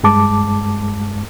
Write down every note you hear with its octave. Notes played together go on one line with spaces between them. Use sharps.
G2 G#3 A5 D6